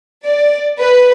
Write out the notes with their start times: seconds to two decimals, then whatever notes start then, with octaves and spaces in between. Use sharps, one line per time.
0.26 D5
0.78 B4